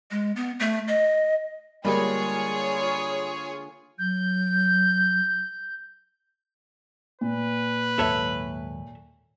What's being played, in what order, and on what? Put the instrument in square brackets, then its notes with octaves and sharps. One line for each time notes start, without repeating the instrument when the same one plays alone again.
[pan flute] G#3
B3
A3
D#5
[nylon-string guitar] D3 G#3 A#3 [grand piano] G3 [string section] F4 G#4 C#5
[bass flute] F#3 [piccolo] G6
[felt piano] A#2 [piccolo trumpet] B4
[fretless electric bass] D#2 G#2 F#3 [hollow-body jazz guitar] A4 C#5 E5